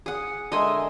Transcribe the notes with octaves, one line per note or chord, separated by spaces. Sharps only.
G#4 F#5 D#6
D3 G#3 A#4 D#5 E5 G#5 C6 D#6